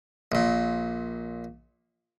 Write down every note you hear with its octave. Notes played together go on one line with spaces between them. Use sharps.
A#1 A#2